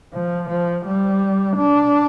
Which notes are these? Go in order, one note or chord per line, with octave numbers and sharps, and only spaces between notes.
F3
F3
G3
D4